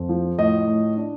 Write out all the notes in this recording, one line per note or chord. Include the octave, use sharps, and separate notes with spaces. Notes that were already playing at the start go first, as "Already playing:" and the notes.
Already playing: F2
F3
A2 D#5
A2
D4